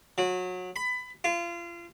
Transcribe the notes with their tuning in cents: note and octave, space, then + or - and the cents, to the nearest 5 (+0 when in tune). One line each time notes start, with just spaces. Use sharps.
F#3 -25
B5 +20
F4 -30